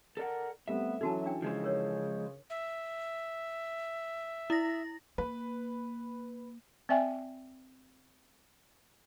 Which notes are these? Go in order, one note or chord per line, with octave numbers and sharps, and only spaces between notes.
A4 A#4 D5 F#5
G3 A3 B3 C4 E5
E3 F#3 C#4 D#4 F#4 A4 A5
D4 G5
C#3 F3 G#3 C5
A#4 C#5
E5
E4 A#6
A#3 B4
C4 D5 E5 G5 G#5